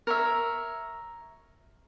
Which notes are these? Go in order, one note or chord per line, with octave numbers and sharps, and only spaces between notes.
A#4 C#5 E5